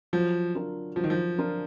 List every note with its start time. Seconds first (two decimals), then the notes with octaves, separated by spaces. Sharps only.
0.13 F3 F#3
0.54 D4 F4 A#4
0.96 F3 F#3
1.04 D#3
1.10 F3
1.38 D4 F4 A#4